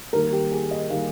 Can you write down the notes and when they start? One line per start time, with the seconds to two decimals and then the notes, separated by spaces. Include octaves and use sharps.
0.13 D#3 G3 A#3 A#4
0.33 G4
0.52 G#4
0.71 D#5
0.90 D#3 G3 A#3 F5